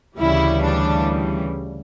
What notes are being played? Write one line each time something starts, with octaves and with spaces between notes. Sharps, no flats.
D2 C#3 E3 G3 E4
D4